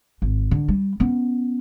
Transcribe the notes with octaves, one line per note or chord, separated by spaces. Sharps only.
G#1
D3
G3
B3 C#4